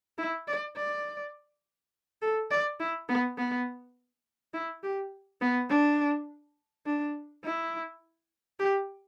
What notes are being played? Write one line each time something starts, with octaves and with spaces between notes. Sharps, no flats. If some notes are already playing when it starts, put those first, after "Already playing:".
E4
D5
D5
A4
D5
E4
B3
B3
E4
G4
B3
D4
D4
E4
G4